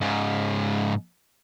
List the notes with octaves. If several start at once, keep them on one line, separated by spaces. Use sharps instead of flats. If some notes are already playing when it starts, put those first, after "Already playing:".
G#2 C#3